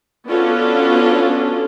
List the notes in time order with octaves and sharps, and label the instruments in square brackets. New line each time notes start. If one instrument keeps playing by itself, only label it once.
[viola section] B3 C#4 D4 F4 F#4 A4